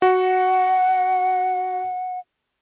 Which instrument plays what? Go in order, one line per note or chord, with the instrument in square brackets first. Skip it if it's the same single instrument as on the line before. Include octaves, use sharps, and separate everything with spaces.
[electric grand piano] F#4 [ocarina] F#5